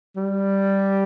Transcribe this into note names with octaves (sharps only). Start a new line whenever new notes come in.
G3